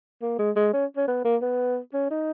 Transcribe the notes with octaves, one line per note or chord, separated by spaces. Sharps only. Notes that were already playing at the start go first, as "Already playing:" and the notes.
A#3
G#3
G#3
C#4
C#4
B3
A#3
B3
C#4
D#4